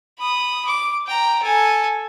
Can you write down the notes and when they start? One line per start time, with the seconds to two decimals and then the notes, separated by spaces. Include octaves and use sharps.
0.19 B5 D#6
0.67 D6
1.07 G5 A#5
1.42 A4 G#5